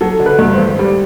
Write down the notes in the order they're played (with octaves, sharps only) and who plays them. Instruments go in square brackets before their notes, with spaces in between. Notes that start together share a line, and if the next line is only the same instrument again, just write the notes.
[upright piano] F#3 [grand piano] A4
[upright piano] D3
[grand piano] B4
[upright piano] G2
[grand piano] C5
[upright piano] G#1
G3